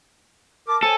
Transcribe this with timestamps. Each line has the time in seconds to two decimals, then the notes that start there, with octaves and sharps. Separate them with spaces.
0.68 A#4 A5 D6
0.83 A4 C5 C#5 G#5